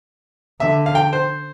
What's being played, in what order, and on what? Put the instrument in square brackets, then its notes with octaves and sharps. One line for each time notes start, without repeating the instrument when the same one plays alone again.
[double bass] D3 [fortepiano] E5
[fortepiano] F5
G5
C5